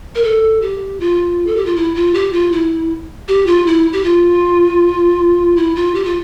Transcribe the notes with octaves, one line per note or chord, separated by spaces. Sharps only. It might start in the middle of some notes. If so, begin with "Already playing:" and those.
A#4
A4
G4
F4
A4
G4
F4
E4
F4
G4
F4
E4
G4
F4
E4
G4
F4
E4
F4
G4
F4